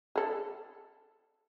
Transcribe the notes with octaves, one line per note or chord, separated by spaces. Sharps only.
G#4 A4